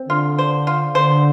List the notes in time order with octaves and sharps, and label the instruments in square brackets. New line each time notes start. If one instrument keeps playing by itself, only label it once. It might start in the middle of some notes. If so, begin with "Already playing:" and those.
Already playing: [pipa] C4
[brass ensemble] D3 [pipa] F4
[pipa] C5
F4
[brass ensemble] D3 [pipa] C5